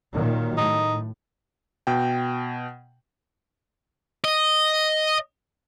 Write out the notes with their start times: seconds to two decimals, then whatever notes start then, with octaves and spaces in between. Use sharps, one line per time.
0.12 A#2 D#3 F#3
0.57 A2 D#4
1.87 B2 G5
4.24 D#5